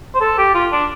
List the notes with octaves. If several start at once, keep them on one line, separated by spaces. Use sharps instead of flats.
C5
A4
G4
F4
D4